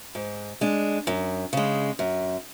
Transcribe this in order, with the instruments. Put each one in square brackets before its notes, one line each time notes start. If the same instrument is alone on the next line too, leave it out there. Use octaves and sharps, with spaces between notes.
[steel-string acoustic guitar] G#2
G#3 D4
F#2
C#3 G#3
F#2